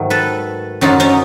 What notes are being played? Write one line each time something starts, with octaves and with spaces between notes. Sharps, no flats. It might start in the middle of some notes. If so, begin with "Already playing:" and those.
Already playing: G#2 D#3 F#3 A3
A4 B4
F#2 D3 F#3 D#4 F4
C#4 D#4